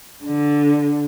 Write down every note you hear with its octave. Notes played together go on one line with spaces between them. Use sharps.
D3